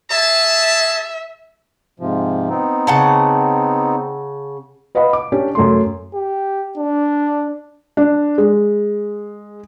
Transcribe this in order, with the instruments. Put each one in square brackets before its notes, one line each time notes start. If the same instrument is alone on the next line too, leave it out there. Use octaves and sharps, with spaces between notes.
[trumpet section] G#4 A5 [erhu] E5
[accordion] G#2 C3 F3
B3 C4 D#4
[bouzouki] C#3 F#5 A5
[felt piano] B4 D#5 F5 F#5 B5
D6
C#4 D4 G4
F#2 A3 C6
[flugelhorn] G4
D4
[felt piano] D4
G#3